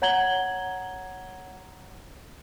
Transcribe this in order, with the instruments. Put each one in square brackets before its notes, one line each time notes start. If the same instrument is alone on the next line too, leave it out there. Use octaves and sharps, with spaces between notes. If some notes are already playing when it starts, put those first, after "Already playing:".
[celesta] C#5 F#5 A#5 G#6 F#7 G7